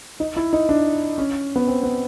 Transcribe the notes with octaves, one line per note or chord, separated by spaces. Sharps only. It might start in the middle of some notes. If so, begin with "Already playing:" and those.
D#4
E4
D#4
D4
C#4
B3
C4
B3